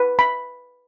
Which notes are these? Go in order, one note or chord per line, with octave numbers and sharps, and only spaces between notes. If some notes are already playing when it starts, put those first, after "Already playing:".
Already playing: B4
B5